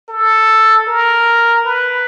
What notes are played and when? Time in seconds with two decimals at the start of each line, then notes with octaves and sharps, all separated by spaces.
0.09 A4
0.87 A#4
1.65 B4